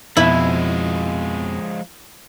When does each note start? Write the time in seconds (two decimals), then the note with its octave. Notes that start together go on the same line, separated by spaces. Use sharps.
0.17 F2 B2 F3 G#3 E4 E5